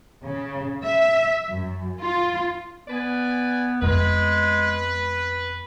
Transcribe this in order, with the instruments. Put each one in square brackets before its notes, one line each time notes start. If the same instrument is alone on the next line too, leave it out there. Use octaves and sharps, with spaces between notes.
[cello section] C#3
E5
F#2
F4
[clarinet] B3 [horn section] B4 D5 G#5
[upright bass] F2 B3 [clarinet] G#3 [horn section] B4